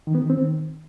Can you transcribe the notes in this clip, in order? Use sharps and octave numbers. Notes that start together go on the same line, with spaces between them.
D#3
B3
D#3
C4
D#3